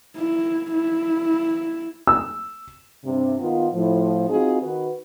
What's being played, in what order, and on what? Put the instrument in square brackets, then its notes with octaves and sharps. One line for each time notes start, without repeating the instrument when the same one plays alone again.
[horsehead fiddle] E4
E4
[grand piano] E6
[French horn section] G2 C3
D#3 B3 F4
A2 F3
C4 D#4 F4 F#4 G#4
D#3 F#4 B4